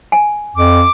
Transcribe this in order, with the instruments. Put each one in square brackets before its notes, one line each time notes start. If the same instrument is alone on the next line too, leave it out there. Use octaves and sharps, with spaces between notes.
[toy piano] G#5
[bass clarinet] F2 [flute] D6